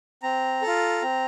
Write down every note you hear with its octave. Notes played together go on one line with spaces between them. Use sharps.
C4 A#5
A4
F4
C4